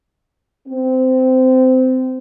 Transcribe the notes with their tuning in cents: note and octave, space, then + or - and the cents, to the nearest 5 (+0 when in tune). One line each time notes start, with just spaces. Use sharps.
C4 -20